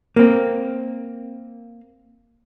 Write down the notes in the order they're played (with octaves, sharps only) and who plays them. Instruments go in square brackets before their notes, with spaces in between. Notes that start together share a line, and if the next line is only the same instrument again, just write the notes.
[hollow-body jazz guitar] A#3 C4